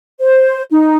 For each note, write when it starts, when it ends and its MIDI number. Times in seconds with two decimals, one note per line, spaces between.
0.20 0.62 72
0.71 0.96 63